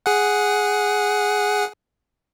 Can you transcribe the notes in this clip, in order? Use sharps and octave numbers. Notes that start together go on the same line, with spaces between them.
G#4 F#5